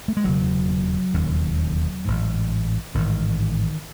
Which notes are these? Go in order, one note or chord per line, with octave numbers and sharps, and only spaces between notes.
A3
G#3
E1 D#2 C#3 F#3
E1 D#2 C#3
A1 G#2
A1 G#2 D#3